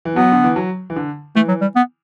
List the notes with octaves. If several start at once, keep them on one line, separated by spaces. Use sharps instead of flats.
E3
F#3 B3
D3
E3
F#3
E3
D3
E3 A3
F#3
G3
B3